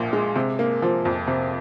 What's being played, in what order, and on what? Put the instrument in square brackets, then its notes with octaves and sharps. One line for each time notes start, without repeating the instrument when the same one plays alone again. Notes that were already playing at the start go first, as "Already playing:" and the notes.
Already playing: [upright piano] A#1 A#2 F3
G#3
C3
A#3
F3
F2
C3